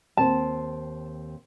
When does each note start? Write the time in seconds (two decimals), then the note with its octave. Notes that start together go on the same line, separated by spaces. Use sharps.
0.17 D#2 C4 C5 A5